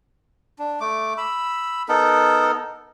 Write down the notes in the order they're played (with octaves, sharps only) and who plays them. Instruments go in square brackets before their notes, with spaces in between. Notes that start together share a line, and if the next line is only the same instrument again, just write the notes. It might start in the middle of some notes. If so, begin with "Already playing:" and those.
[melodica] D4
A3 D6
B5 E6
B3 D#4 A4 A#4